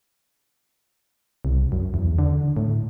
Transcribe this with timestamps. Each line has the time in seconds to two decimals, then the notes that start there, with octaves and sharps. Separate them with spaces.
1.45 C2
1.72 F#2
1.94 E2
2.19 D3
2.57 A2